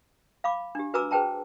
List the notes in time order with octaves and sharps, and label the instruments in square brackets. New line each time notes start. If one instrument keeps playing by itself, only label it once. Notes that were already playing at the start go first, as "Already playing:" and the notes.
[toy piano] F5 B5 D6
D4 G4
F#4 B4 G#5 A#5 D6 E6
G#4 B4 C5 G5 A5 A#5